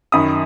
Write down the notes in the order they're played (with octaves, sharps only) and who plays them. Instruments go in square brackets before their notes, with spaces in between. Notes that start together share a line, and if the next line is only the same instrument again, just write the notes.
[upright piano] F#2 D#3 B5 D#6